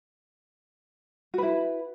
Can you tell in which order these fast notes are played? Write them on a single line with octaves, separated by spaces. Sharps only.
F#4 B4 E4